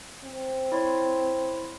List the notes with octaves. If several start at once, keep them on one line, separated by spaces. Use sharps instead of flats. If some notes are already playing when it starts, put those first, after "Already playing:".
C4
E4 C#5 C6